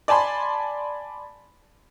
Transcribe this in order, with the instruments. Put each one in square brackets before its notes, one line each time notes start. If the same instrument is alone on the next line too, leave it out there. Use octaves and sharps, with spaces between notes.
[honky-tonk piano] D5 G#5 A5 B5 C6